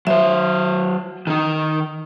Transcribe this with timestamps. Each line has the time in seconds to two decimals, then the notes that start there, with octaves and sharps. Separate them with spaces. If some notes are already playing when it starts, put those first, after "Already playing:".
0.07 F#3 C5 E5
1.27 D#3 D#4